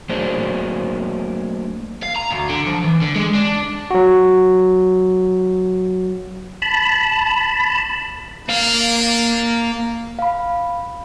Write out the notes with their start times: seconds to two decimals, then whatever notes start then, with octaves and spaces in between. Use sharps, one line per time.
0.09 F#3 A3 A#3 D4 G#4 C5
2.03 F5
2.16 A#5
2.31 D2
2.50 D3
2.66 F3
2.84 E3
3.02 D3
3.16 G#3
3.35 D4
3.91 F#3 F#4
6.62 A5 B5
8.49 A#3 D4 F5
10.19 F5 B5